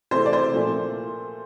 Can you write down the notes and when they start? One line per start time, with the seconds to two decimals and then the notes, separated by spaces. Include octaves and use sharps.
0.11 C3 E3 A3 C5
0.26 D5
0.33 C5
0.54 A#2 F3 A3